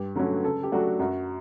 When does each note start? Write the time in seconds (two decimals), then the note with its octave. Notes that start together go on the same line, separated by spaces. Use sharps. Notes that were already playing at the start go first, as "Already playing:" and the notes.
Already playing: G2 G4
0.15 D3 F#3 A3 C#4
0.44 C#3 A4
0.63 G4
0.72 F#3 A3 D4 F#4
0.99 F#2 F#4